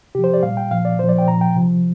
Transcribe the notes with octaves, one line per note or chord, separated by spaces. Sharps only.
C3 F3 G4
C5
D5
A#2 G3 F5
G5
A#2 F3 F5
D5
A#2 F3 C5
D5
G5
A#2 F3 A#5
G5
C3 F3